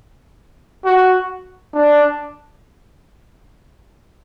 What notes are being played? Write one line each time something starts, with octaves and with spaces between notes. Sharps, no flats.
F#4
D4